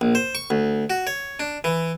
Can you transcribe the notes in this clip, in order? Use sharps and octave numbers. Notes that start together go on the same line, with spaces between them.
A#1
C5
C#6
D2
F#4
C#5
D4
E3